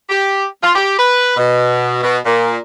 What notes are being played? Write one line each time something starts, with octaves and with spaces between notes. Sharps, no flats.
G4
F4
G4
B4
B2
B2
A#2